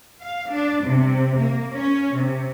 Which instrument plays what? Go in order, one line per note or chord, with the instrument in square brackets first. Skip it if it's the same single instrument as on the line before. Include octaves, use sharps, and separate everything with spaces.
[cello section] F5
D4
C3
A#3
C#4
C3